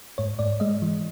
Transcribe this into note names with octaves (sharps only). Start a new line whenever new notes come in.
G#2 C#5
G#2 D5
G#3 D#5
E3